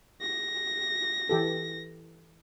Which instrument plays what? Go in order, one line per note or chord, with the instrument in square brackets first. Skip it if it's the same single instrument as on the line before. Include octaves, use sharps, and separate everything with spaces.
[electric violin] A#6
[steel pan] E3 G4 A4